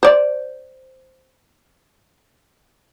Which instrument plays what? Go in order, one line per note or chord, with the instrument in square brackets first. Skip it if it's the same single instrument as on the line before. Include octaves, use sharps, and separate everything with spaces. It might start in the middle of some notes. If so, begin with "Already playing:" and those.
[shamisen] C5 D5